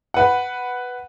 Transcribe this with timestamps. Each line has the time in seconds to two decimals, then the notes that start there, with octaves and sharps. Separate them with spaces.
0.14 B4 F#5